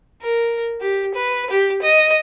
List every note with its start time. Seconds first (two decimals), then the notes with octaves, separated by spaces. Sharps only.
0.21 A#4
0.81 G4
1.14 B4
1.50 G4
1.82 D#5